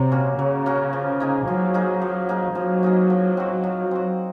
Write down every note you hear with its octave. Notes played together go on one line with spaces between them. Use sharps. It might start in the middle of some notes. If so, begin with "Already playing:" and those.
Already playing: C3 F#3
A#3 C#4 F#4
C#3 F#3
A#3 C#4 F#4
F3
A#3 D#4 G#4
F3 F#3
A#3 D#4 G#4
F3
A#3 D#4 G#4
F3 F#3
A#3 D#4 G#4
F3
C4 F#4
F3
C4 F#4